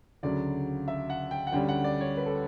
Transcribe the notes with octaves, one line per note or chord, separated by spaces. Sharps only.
D2 C#3 F#3 D5
E5
F#5
G5
F#5
D2 D3 G3 C#4 G5
F#5
D5
C#5
B4
A4